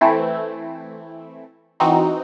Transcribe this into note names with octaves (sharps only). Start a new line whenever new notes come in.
E3 A3 C4 E4
E3 C4 D#4 F#4